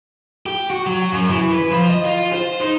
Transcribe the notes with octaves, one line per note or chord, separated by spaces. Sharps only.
G4
F#4
F#3
F#2
E3
B4
F3
D#5
F4
C5
D#4